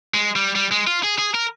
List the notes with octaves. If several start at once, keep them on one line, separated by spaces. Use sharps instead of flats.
G#3
G3
G3
G#3
F4
G#4
G#4
A#4